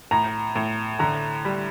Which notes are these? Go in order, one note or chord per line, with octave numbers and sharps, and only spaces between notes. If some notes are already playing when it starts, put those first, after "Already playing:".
A2 A#5
A2
D3 A#5
G3